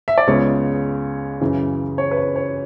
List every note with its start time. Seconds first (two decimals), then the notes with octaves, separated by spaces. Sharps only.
0.08 E5
0.18 D5
0.27 C#2 C#3 G#3 B3 C#5
1.41 F#2 C#3 E3
1.98 C#5
2.11 B4
2.17 C#5
2.36 C#5